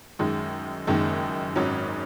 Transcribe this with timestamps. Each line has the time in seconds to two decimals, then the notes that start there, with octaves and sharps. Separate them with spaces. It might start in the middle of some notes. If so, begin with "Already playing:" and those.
0.19 F#2 D#3 G#3
0.87 F#1 F#2 D#3 G#3
1.55 G#1 G#2 F#3 C#4